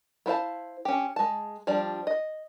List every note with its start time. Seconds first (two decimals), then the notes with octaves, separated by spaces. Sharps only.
0.26 B3 E4 C5 F5 A5
0.85 C#4 G4
1.16 G#3 A5
1.67 F3 G3 D4 D5
2.07 D#5